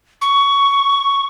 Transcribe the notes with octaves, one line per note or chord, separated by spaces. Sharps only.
C#6